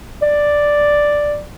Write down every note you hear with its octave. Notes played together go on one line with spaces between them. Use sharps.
D5